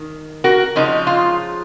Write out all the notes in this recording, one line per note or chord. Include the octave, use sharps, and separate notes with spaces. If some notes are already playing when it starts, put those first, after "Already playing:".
Already playing: D#3
F#4 A#4
C#3 F3 G#3 D#4
F4